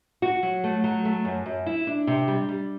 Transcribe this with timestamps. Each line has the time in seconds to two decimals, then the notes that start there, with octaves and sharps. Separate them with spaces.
0.22 F#4
0.43 F#3
0.64 A3
0.84 F#3
1.05 A3
1.25 F#2
1.46 F#2
1.66 E4
1.87 D4
2.07 C3
2.28 G3
2.49 G3